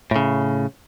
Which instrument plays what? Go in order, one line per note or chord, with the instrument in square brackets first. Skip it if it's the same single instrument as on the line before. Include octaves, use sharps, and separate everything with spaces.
[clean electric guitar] A2 C#3